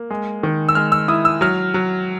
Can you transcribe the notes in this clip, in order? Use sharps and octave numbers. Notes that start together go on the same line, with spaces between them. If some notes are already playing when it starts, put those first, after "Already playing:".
Already playing: A#3
G#3
D#3
E6
G#3 F6
E6
E4 D#6
E6
F#3 F6
F#3